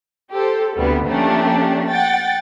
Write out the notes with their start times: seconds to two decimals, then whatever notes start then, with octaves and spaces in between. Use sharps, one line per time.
0.31 G4 A4 C5
0.76 D2 C3 G3 B3
1.08 F3 A3 A#3 C#4 D4 G4
1.88 F#5 G5 A6